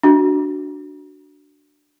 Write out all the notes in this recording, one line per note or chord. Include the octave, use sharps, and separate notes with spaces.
D4 F#4